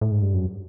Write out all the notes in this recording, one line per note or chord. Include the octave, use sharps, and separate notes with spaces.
A2
G#2
G2
F#2